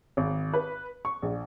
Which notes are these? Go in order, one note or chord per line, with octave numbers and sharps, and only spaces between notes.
G#1
B4
C#6
A#1